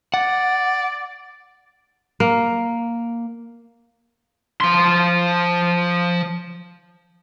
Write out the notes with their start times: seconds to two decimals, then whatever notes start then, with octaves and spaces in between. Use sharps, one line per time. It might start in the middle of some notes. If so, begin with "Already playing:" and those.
0.14 D5 F#5
2.20 A#3
4.61 F3 C6